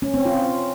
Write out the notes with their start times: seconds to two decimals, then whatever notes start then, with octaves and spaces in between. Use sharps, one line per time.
0.02 C#4
0.14 C4
0.25 F4